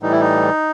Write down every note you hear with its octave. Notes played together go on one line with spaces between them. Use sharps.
A2 E3 G3 D#4
E4
D#4